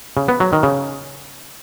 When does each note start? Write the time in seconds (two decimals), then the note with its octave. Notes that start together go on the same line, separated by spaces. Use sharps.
0.17 C#3
0.28 B3
0.40 F#3
0.53 D#3
0.63 C#3